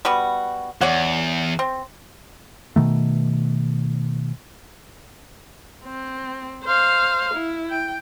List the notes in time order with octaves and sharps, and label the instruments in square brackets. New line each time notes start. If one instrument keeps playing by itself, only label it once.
[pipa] G3 B3 F#4
[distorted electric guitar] E2 [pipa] C#5 D5 F#5
[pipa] C4
[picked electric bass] B2 D#3 A3
[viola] C4
C5 F5
E4
G5